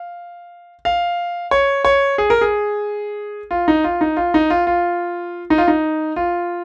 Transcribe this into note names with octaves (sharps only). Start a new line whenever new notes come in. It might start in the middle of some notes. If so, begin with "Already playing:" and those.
Already playing: F5
F5
C#5
C#5
G#4
A#4
G#4
F4
D#4
F4
D#4
F4
D#4
F4
F4
D#4
F4
D#4
F4